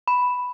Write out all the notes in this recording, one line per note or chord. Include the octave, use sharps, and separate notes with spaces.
B5